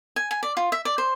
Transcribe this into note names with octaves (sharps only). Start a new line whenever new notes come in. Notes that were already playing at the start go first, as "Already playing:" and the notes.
G#5
G#5
D5
F4
E5
D5
C5